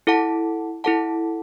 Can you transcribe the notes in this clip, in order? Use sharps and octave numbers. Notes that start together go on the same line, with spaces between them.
E4 A4 F#5 A5
E4 A4 F#5 A5